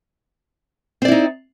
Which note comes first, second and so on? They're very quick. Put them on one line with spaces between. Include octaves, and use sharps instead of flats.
C4 D5 E4 D#4